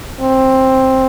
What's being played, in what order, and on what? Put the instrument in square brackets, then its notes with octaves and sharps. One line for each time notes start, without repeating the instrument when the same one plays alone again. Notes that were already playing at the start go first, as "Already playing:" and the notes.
[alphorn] C4